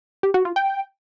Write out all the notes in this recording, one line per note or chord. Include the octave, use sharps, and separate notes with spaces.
G4
F#4
F4
G5